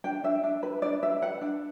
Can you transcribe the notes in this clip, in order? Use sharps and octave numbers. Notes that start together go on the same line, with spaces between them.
D4 G5
D4 E5
D4
B4
D4 D5
D4 E5
B4 F#5
D4